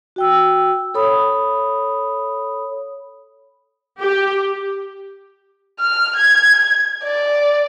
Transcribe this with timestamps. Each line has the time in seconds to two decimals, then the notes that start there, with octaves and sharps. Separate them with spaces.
0.16 F#4 G5 E6
0.94 A4 C#5 B5 D#6
3.99 G4
5.79 F6
6.17 G#6
7.04 D5